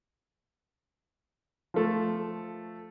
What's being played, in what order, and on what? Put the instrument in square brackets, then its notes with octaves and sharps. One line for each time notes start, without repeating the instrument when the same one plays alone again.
[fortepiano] F3 A3